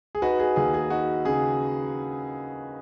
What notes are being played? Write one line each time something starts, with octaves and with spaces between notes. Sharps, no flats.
G#4
D#4 F#4 B4
G#4
D#2 G#4
G#4
D#4 F#4
C#3 G#4